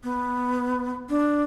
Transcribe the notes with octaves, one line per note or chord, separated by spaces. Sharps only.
B3
D4